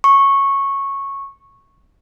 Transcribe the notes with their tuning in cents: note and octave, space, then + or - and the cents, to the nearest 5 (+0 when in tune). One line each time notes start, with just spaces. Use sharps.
C#6 -10